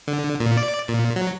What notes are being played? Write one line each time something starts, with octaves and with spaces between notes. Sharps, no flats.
D3
A#2
D5
A#2
F#3